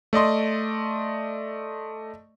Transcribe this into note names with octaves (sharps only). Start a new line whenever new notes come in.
A3 D5 D#5 C6